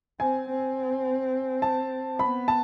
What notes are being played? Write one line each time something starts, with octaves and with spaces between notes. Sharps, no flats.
C4 G#5
C4
A5
B3 B5
A5